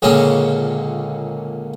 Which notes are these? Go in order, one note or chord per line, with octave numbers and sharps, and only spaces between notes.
C#2 A#2 D3 G#3 A#3 C#4